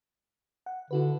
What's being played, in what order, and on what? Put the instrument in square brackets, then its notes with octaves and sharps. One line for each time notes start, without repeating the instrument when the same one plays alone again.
[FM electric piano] F#5
[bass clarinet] D3 [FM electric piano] E4 F#4 B4